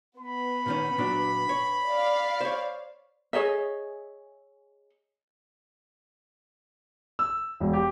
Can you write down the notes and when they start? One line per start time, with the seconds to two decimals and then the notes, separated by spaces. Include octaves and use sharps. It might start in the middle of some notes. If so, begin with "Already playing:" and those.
0.20 B3 B5
0.66 A#2 D#3 C#4
0.98 A#2 F#3 D4
1.49 C#5
1.87 D5 F5
2.41 C5 C#5
3.33 G#4 C#5 D#5 E5
7.19 E6
7.60 E1
7.73 G4